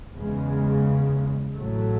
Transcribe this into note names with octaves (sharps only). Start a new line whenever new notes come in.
E2 C#3 G#3
A1 A2 F#3 A3